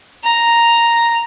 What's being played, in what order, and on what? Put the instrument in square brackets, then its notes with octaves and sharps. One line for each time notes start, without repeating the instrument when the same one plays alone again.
[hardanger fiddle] A#5